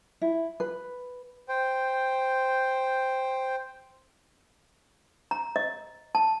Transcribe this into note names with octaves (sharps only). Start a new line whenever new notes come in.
E4
B4
C5 G5
A#5
D#5
A5